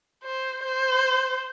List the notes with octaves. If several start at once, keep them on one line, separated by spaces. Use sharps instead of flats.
C5
C5